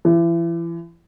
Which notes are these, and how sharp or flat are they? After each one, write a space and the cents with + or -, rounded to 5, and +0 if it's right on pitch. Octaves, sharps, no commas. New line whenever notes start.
E3 +35